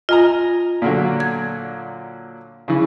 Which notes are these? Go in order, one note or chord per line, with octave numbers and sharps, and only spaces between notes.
F4 D#5 G#5 A#5
A#2 D3 F#3
G#6
C#3 E3